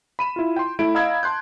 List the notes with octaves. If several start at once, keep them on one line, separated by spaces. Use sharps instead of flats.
B5 D#7 E7
E4 F4
G5 C6
A3 E4 D7
D#5 F5 A#5 B5 E6 G#6
A5 C6 F#6 G6